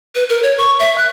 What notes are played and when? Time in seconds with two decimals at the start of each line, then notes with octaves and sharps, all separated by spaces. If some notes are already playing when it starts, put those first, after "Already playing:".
0.15 B4
0.29 A#4
0.43 C#5
0.58 C#6
0.79 E5
0.98 F#6